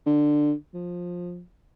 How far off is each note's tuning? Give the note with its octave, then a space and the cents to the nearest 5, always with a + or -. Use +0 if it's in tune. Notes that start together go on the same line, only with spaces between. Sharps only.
D3 +15
F3 +15